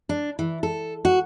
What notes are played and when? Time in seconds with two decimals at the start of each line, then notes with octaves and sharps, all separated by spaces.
0.09 D4
0.39 E3
0.63 A4
1.05 F#4